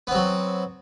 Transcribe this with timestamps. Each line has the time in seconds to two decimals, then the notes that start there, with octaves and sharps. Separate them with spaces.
0.07 B3
0.11 C4
0.15 F#3